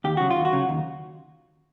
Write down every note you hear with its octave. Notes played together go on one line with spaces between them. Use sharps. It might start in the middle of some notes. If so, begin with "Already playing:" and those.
D#2 G4
C#3 F#3 F#4
F4
D#2
F#4
C#3 F#3
D#2